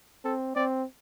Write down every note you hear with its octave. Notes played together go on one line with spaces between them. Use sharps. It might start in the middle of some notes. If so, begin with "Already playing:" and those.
C4 A4
C4 D5